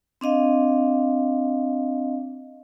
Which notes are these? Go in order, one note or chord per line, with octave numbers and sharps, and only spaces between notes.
C4 D4 D#5 F5